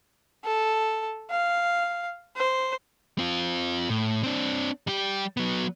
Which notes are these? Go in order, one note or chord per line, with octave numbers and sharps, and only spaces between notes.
A4
F5
C5
C4 F4
A2
C4 D4
G3 G4
F#3 B3